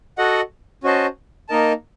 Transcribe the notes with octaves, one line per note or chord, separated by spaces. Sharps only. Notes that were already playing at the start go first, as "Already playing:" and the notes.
F#4 A4 D#5 F#5
C#4 F#4 C5 D#5 A5
A#3 D#4 A#4 D#5 A5